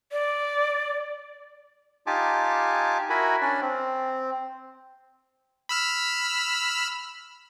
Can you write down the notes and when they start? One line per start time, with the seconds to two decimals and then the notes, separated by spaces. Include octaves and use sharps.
0.12 D5
2.07 D#4 F4 G4 G#5 A5 D6
3.10 E4 F#4 A#4 G#5 B5
3.42 C#4 D4 D5
3.62 C4
5.69 B5 E6 F6